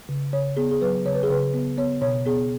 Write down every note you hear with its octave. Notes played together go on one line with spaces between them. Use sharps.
C#3
C#3 C#5
B3 G#4
G#4
F#3 B4
C#3 C#5
B4
G#4
C#3 B4
B3
B3 C#5
B2 C#5
B3 G#4